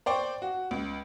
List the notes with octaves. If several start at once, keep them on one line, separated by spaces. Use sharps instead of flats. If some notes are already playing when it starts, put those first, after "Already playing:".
C5 D5 G5 C#6
F#4
C#2